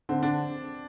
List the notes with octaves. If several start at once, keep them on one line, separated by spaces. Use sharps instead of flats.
D3 C4
D3 D4